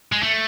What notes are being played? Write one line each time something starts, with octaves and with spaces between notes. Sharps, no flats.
G#3
A3